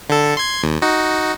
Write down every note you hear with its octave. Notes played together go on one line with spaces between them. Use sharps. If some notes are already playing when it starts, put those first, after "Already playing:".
D3 A4
C6 G#6
D#2
D#4 F#4